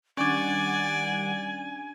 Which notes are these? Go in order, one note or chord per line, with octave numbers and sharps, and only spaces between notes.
D#3 G3 C#4 D4 D5 F#5 G#5